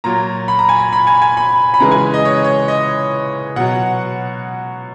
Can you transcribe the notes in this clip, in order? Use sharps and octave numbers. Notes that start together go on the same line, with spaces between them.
A#2 F#3 A#5
B5
A#5
G#5
A#5
B5
G#5
G#5
B5
B5
C#3 E3 G#3 A#5
G#5
D#5
C#5
D#5
C#5
D#5
B2 F#3 F#5